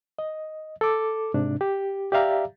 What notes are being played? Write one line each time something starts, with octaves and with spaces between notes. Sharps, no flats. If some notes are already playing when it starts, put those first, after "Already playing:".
D#5
A4 D6
G#2 C3 D4
G4
G4 D5 E5 F5 A#5